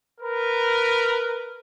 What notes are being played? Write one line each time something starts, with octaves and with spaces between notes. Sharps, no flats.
A#4 B4